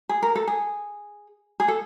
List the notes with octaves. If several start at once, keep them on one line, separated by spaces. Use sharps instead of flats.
G#4
A#4
A4
G#4
G#4
A4